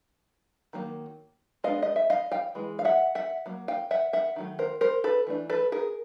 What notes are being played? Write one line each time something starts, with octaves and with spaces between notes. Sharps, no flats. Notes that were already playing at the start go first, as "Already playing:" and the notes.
D#3 F#3 A#3
G#3 B3 D4 D#5 F5
D#5
E5
D#5 F5
F5 G5
E3 G#3
F5
E5 F#5
E5 F#5
F#3 A#3
F5 G5
E5 F#5
E5 F#5
D#3 F#3 A3
A#4 C5
A#4 C5
A4 B4
E3 A3 D4
A4 B4
G#4 A#4